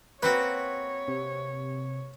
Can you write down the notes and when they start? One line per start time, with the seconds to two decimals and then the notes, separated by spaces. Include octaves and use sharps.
0.23 A#3 C4 F#4 B4 C#5
1.08 C3